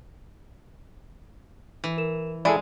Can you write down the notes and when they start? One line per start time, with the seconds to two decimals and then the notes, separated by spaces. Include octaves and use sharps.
1.84 E3
1.97 E4 A#4 E7
2.45 G#3 E4 G#4 A4 D5 G#5 B5